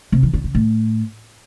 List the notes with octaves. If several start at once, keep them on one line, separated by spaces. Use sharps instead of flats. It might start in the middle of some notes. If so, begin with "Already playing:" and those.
C3
E3
D3
C#3
A2